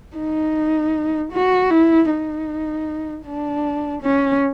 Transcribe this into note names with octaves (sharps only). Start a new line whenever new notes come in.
D#4
F#4
E4
D#4
D4
C#4